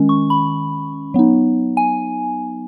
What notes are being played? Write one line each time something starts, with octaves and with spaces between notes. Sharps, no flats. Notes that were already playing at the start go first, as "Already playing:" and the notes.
Already playing: D#3 G#3 C#4
C#6
B5
F#3 B3 D#4
G#5